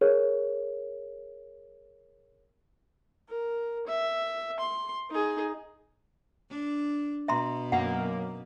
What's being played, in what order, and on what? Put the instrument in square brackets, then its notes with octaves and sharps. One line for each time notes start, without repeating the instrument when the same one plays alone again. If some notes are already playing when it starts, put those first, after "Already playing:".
[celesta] G#4 A#4 C#5
[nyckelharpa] A#4
E5
C6
D#4 G#4
[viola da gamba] D4
[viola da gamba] B2 [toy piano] E5 A#5 C6
[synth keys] F#2 A#3 [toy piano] F#5